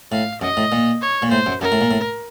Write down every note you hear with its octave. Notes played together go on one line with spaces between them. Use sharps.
A2 F5
F#2 D#5
A2
A#2
C#5
A#2
A2 C5
F#2
F#2 A#4
A2
A#2
A2